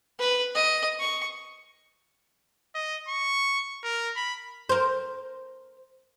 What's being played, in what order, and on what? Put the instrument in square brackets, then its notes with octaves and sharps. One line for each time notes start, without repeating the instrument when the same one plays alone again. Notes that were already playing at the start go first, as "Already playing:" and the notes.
[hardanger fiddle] B4
D#5
C#6
[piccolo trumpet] D#5
C#6
A#4
B5
[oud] A#4 C5